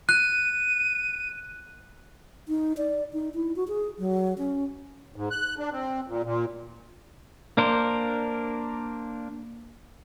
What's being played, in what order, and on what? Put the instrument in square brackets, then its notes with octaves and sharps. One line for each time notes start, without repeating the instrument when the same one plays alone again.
[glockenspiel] F#6 [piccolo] D#7
[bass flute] D#4
D5
D#4
E4
F#4
G#4
F#3
C#4
[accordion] G#2
F#6
D4
C4
A#2
A#2
[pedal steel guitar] A#3 D4 A#4 C5